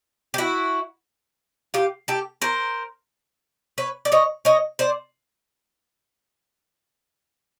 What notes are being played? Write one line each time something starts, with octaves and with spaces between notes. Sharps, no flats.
G4
E4 F#4
F4 G4
G4 A4
A#4 C5
B4 C#5
D5
C#5 D#5
C#5 D#5
C5 D5